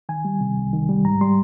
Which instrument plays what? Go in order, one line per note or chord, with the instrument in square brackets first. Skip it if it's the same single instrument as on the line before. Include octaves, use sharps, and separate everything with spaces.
[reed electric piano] D#3 G#5
G3
C3
C2
D#3
G3
G#2 A#5
G3 C6